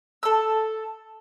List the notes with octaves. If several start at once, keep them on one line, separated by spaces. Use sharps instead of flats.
A4 E6